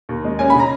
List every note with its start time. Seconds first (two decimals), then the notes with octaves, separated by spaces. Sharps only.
0.09 D#2
0.25 G#3
0.39 C#4 G#5
0.50 C#3 B5
0.60 A#5